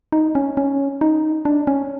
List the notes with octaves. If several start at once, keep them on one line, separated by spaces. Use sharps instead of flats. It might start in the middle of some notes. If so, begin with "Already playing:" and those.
D#4
C#4
C#4
D#4
D4
C#4